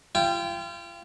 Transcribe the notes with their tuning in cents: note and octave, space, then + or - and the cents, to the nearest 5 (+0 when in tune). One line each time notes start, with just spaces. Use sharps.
F4 -35 G5 +0